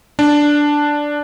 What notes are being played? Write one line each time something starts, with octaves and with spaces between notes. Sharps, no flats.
D4